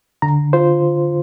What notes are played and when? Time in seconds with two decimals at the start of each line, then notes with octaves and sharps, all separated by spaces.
0.22 D3 A#5
0.53 F4 C5